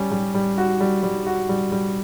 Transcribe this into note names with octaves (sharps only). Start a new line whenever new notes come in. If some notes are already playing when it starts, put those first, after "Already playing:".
Already playing: G3 C#4
G3
G3
F#4
G3
G3
F#4
G3
G3